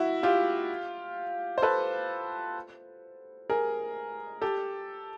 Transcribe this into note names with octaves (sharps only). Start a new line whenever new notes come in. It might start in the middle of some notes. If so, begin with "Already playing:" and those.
Already playing: E4 F#4
F4 G4
C5
A4 B4
G#4 A#4
G4 A4